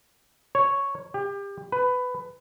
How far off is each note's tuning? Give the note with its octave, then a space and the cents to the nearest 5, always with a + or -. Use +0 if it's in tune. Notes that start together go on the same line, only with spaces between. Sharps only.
C#5 +0
G4 +30
B4 +15